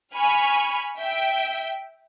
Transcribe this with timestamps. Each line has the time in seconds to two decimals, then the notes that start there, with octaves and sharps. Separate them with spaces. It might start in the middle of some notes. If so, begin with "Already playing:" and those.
0.15 G#5 B5 C#6 F6
0.99 E5 G5